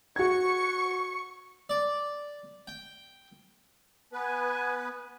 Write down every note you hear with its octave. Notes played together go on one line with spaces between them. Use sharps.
F#4 C#6 G#6 C#7
D5
G5
B3 B4 G#5